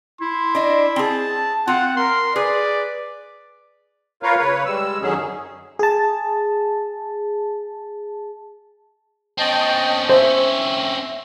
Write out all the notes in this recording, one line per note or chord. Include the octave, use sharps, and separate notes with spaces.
E4 C6
D4 D#5
C4 G#4 A5
C4 F4 F#5
A#4 C6
G#4 B4 D5
F4 A#4 B4 C#5 F5
C#3 B4 C#5
G3 G#3 E6
F#2 D3 D#3 F#3 C#4 G#4
G#4 A5
C4 C#4 D#5 G5 A5
C5 E5